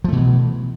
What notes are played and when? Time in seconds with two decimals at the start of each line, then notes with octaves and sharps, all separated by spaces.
0.04 F3
0.08 A3
0.12 B2
0.16 E3